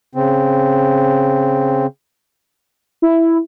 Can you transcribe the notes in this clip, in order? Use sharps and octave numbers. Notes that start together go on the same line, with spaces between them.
C#3 C4
E4